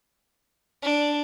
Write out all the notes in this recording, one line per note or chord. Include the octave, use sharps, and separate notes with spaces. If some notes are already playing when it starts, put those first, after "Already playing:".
D4